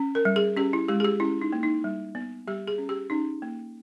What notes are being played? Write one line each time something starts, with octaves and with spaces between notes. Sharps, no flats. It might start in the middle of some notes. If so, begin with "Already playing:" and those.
Already playing: C#4
A#4
G3
G#4
C#4 G4
E4
G#3 G4
G#4
G4
C#4 E4
D#4
A#3
D#4
G3
B3
G3 G4
G#4
C#4
G4
C#4 D#4
A#3